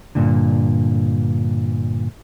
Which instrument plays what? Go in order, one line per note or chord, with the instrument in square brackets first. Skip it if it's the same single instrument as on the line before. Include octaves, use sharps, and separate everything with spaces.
[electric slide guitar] G2 A#2 D3